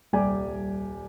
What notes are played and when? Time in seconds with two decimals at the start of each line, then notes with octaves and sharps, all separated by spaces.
0.13 D#1 C2 G3 G4 D5 G#5